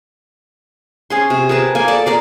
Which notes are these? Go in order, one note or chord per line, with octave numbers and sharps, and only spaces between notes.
C#4 G#4 C6
C3
G#4 A#4 B4 A5
A#3 G#5
A4 D5 A5
G#4 A#4 D5